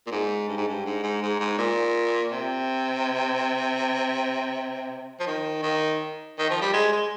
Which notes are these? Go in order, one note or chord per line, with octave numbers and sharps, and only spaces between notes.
A#2
G#2
G2
G#2
G2
G#2
G#2
G#2
G#2
A#2
C3
F3
D#3
D#3
D#3
F3
G3
G#3
G#3